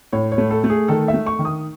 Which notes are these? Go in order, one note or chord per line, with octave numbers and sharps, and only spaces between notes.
A2 C#5
C#5
A3
A4
A3
G#4
D#3 A4
E5
A3
C#6
D#3
D#6